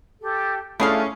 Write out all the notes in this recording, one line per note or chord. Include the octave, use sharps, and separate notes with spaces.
G4 A4
A3 C#4 D4 E4 F4 G#4 F5